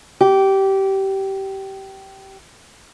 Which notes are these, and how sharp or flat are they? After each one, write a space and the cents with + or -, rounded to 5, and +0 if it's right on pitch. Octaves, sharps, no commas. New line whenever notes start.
G4 -20